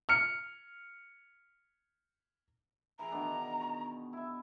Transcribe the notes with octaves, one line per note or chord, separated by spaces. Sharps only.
F6 C#7
E3 G#4 A#5
B2 D#3 D4
C#6
E4 E5